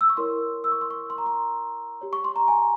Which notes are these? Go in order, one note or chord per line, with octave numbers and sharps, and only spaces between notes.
E6
C#6
E4 A#4 C#5 C6
E6
C#6
C6
C#6
C6
A#5
C6
G4 C#5
C#6
C6
A#5
G#5